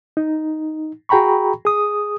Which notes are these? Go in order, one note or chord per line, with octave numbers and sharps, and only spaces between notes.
D#4
F#4 G#4 G5 A#5 B5 C#6
G#4 D#6